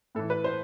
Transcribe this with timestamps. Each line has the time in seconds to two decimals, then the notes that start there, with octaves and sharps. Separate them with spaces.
0.15 A2 A4
0.19 E3
0.30 B4
0.44 C5